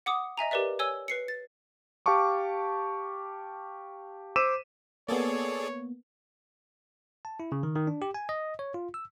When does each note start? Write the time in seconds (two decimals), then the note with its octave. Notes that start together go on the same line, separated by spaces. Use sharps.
0.06 F#5 D6 D#6
0.37 D#5 E5 G#5 A#5
0.51 G4 A#4 B4 D5 E5
0.79 C#5 G#5 E6 G7
1.08 B4 C7 C#7
1.28 A6
2.06 G4 F5 A5 C#6 D6
4.36 C5 D6 E6 B6 D#7 E7
5.09 A#3 B3 G#4 A4 C#5 D5
7.25 A5
7.40 E4
7.52 C#3
7.63 D#3
7.75 D#3
7.87 D4
8.02 G4
8.14 G#5
8.29 D#5
8.59 C#5
8.74 F4
8.94 E6